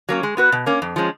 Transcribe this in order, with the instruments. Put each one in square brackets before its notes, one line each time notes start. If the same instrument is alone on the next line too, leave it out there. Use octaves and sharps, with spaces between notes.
[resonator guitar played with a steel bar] F#3 A#3 C#4
G#3
B3 F#4 B4
B2
A#3 C#4
F2
F3 G#3 C#4